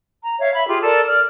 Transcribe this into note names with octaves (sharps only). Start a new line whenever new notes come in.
A#5
C#5 E5 F5
E5 B5
F4 G4 G#4
A4 A#4 D5
D5 F6